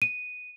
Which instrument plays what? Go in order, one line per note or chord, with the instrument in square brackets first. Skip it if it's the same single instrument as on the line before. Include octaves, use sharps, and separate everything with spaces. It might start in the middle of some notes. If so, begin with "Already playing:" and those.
[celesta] D#7